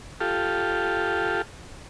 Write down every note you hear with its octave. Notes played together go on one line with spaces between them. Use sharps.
F4 G4 A4